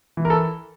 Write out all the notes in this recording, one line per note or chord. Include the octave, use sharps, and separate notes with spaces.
E3
A#4
A4